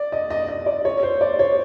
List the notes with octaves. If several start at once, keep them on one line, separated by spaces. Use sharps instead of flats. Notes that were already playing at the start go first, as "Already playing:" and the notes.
Already playing: D5
D#5
D#5
D#5
D5
C#5
C5
D5
C#5